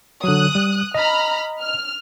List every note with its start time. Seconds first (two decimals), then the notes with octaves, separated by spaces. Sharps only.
0.24 D3 F#3 D#6 F#6
0.55 G3
0.94 D#5 A#5 B5 F6
1.62 F6